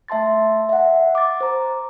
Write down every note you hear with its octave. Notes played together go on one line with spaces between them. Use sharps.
A3 E5 A5 C6 A6
E5 F#5
D6 A6
C5 A#5